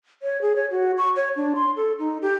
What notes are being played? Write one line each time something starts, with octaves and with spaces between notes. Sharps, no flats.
C#5
G#4
C#5
F#4
C#6
C#5
D4
C6
A4
D#4
G4